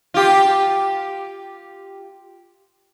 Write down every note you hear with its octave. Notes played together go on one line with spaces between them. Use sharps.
F4 G4